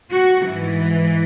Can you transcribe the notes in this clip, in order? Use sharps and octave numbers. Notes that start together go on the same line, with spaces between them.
F#4
G#2 E3